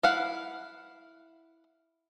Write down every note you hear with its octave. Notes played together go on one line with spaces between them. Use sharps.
E4 F5 F#5